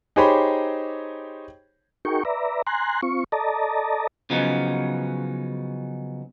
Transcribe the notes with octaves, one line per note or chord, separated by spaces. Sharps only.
D#4 G4 G#4 C5 C#5 B5
D#4 F#4 G#4 A#4 G5 C#6
B4 D5 E5 A#5
G#5 A#5 C6 F#6
C4 F4 C#6
A4 D5 D#5 A5 A#5
C#3 F3 F#3 B3 D#4